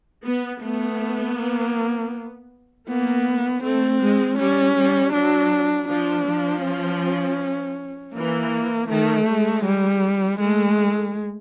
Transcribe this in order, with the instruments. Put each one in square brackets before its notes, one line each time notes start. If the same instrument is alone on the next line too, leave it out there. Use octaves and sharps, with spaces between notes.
[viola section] B3
[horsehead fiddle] A3 [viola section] B3
[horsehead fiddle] A#3
[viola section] A#3 [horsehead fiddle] B3
[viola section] A3 [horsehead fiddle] C4
[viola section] G#3
[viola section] G3 [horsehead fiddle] C#4
[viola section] G3
[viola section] F#3 [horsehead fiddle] D4
[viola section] F3 [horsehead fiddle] D4
[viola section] F3
[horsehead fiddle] C#4
[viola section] E3 [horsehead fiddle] A#3
[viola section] D#3 [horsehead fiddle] A3
[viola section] G#3
[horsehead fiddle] G3
[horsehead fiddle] G#3 [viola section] A3